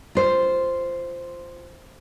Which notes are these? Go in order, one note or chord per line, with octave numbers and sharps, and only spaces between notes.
F4 C5